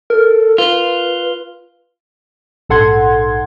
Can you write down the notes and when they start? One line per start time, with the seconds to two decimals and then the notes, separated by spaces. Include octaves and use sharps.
0.10 A4 A#4
0.58 F4 B4
2.69 A#1 G#2 A4 F#5 C6 G#6